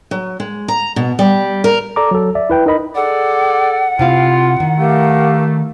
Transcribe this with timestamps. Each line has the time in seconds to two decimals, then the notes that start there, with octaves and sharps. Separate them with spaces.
0.11 F#3
0.40 G#3
0.68 A#5
0.96 B2
1.19 G3
1.64 A#4
1.96 A4 D5 A#5 D6
2.11 F#3 A4
2.35 D5 E5
2.50 E4 B4 G5
2.66 D#4 A#4 D#5 B5
2.95 G#4 A4 D5 F#5
3.99 C3 E4 F4 F5
4.60 D#3
4.78 A3 G4 A#4 F5